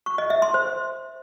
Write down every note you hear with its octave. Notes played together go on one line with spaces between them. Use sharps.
C#6
D#5
E5
C6
C5